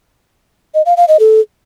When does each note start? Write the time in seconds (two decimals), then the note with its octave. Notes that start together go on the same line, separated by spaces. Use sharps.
0.74 D#5
0.86 F5
0.97 F5
1.08 D#5
1.20 A4